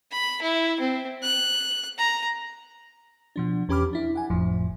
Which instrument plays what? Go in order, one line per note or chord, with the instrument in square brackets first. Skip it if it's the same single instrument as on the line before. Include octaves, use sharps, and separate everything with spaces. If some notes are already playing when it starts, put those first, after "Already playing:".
[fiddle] B5
E4
C4
F#6
A#5
[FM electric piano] B2 F3 D4
E2 C#4 G4 B5 D6 F6
D4 E4
F#5 G#5
G1 F2 A2 F3